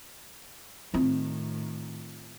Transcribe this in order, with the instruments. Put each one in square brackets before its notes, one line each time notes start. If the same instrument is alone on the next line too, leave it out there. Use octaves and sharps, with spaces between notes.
[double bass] A2 D#3 [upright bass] C4 F4